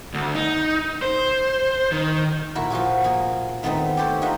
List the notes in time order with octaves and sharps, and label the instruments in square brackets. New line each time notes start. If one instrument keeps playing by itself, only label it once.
[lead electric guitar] D2
D#4
C5
D#3
[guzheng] A#2 E4 F#4 A#4
F3 F4 F#4 G#4
A#3 G#4
D#3 A3 B3 C4 D#4
G4 A4 C5 C#5
D#4 F4 A#4 E5 F#5